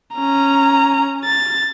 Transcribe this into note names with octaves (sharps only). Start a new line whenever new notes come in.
C#4 A#5
A6